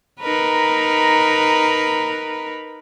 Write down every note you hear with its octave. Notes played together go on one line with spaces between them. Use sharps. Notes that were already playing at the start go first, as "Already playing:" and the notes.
D#4 A#4 B4